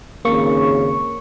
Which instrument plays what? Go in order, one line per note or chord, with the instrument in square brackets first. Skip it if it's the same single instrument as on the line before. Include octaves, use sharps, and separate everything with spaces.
[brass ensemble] G#1 D#2 C#3 [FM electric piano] A#3 C#6